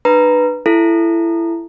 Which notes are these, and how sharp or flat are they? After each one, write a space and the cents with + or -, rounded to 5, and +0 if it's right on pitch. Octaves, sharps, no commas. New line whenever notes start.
D4 +40 B4 +0 A#5 +0
E4 +20 A4 +0